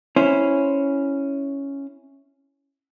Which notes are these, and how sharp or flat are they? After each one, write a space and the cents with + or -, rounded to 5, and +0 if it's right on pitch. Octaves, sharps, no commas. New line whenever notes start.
C#4 +0 E4 -5 C5 +0